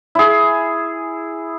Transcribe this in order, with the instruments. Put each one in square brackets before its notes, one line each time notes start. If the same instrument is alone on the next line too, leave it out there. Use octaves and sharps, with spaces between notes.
[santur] E4 G#4